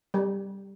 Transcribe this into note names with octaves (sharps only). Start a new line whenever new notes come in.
G3